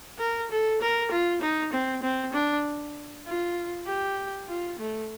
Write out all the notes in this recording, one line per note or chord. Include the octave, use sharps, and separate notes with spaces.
A#4
A4
A#4
F4
D#4
C4
C4
D4
F4
G4
F4
A3